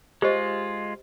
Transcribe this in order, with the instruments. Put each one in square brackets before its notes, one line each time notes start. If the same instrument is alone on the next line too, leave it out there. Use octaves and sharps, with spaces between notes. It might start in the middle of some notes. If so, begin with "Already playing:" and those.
[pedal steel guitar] G#3 F4 [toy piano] G4 C5 D#5